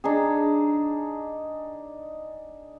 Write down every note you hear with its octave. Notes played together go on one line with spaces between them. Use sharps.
D4 D#4 G#4